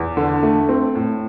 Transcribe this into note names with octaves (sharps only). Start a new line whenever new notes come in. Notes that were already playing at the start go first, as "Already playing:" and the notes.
Already playing: E2
D3
A3
C4
A2